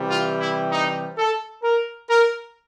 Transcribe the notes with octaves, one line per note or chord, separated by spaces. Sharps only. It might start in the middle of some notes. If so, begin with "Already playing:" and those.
Already playing: C3 E3 G3
F4
E4
D#4
A4
A#4
A#4